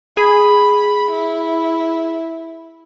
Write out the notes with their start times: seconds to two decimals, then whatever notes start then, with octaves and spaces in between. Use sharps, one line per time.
0.17 G#4 B5
1.11 E4